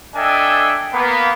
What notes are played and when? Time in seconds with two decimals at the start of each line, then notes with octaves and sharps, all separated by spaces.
0.15 D4 A4 D#5 E5 G5 G#5
0.93 A#3 B3